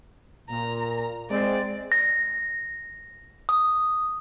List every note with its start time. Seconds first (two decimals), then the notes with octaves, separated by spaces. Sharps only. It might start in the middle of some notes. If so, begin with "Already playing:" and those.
0.49 A#2 A#5
1.30 G#3 C4 D5
1.92 A#6
3.49 D#6